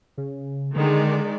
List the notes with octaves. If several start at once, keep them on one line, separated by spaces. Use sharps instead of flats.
C#3
D3 D#3 G#3 D5